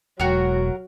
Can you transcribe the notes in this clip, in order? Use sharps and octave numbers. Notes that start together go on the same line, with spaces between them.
E1 F#3 F#4 A#4